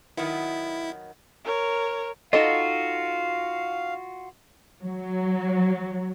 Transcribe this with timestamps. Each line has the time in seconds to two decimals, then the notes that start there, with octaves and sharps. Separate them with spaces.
0.17 D#3 F#3 B3 E4
1.45 A#4 C#5
2.33 D#4 F4 F#4 A4 D#5 F5
4.83 F#3